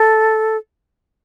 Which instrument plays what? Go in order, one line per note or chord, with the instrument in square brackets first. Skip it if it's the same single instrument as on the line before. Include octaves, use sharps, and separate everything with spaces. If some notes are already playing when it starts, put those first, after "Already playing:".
Already playing: [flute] A4